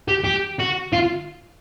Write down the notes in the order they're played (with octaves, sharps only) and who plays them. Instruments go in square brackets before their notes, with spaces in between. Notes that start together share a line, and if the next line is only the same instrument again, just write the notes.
[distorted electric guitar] G4
G4
F#4
F4